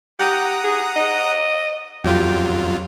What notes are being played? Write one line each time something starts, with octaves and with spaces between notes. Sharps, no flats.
G4 F#5 A#5 D#6
G#4
D#5
F2 F#3 F4 G4